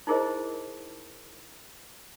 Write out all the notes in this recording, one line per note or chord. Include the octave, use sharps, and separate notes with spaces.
D#4 E4 G#4 A#4 C5 D#5